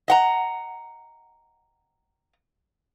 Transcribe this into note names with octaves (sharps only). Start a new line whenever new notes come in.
D#5 F#5 A#5